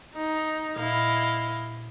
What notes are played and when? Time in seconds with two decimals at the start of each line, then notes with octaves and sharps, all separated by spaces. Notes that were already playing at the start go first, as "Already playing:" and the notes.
0.15 D#4
0.76 A#2 E4 D#5 F5